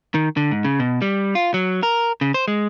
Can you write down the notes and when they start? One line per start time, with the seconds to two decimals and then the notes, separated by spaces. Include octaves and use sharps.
0.14 D#3
0.37 D3
0.51 G#2
0.65 C#3
0.80 B2
1.02 G3
1.35 F4
1.54 F#3
1.83 A#4
2.21 C#3
2.34 C5
2.48 G#3